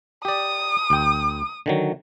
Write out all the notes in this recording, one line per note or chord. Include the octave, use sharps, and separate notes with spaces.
G4 D5 D#6
D2 G5
D3 D#3 F#3